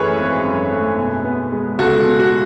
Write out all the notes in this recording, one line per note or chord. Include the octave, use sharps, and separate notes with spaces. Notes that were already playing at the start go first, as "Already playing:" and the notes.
Already playing: F#2 E3 A3 G#4 A4 B4 C#5
G#1
F#2
A3
B2
B3
G#3
C#2 F#4 A4
B2
F#4